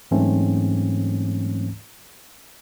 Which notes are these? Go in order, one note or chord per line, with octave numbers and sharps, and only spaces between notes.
G#2 E3 F#3 A3 C4 C#4